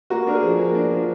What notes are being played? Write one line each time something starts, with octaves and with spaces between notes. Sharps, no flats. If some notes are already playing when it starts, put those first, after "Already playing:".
A#3 F#4
D4 A#4
G#4
F3
A#3
D4
F3